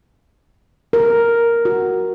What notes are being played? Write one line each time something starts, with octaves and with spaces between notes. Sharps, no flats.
A#4
F#4